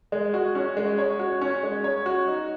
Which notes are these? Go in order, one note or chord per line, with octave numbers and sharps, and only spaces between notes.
G#3
F#4
C#4
G#3
C#5
F#4
C#4
G#3
C#5
F#4
D#4